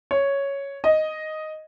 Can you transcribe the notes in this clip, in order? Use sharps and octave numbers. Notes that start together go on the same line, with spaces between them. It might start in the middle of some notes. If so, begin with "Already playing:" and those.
C#5
D#5